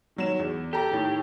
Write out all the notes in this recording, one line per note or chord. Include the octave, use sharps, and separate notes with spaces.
D#3 F#3 E7
E2
G4 A4 A#5
A2 D#3